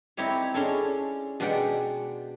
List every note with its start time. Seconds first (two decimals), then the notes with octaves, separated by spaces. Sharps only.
0.17 C4 D#4 E4 G4 C#5
0.54 G#3 C#4 D4 A4
1.40 B2 G#3 D4 G4 F#5 G5